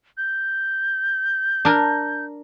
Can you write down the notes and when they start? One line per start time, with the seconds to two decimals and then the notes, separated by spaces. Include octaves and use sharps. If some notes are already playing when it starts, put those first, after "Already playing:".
0.18 G6
1.65 D4 A#4